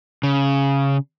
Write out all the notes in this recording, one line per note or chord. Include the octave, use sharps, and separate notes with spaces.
C#3